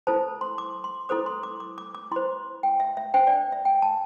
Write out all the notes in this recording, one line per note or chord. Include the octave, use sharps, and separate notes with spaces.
E4 A4 C5 A5
C6
D6
C6
E4 A4 C5 D6
C6
D6
D6
D6
D6
E4 C5 C6
G5
E5
E5
D4 C5 G5
D5
E5
G5
A5